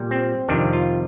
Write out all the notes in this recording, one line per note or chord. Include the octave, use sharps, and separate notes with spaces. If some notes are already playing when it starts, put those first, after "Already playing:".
Already playing: A#2 G3
C4
F2 C3 D#3 G3 D4
F4